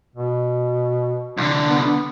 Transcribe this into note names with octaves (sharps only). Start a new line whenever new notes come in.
B2
C2 D3
B3